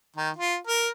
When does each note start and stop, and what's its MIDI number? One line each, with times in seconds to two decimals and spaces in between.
0.16 0.30 51
0.37 0.56 65
0.67 0.89 70